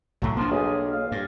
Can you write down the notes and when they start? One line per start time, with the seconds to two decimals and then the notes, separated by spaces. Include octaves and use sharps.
0.22 B1 A2 F#3 A3 F#4
0.37 F3 A#3 B3 D4
0.52 B1 G#4
0.92 F5
1.12 G2